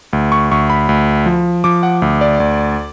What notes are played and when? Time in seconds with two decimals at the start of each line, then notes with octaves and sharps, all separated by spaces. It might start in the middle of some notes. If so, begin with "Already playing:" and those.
0.13 D2
0.32 C#6
0.51 D2 C#6
0.70 B5
0.89 D2
1.26 F3
1.64 F3 D6
1.83 F#5
2.02 D2
2.21 D5
2.40 D2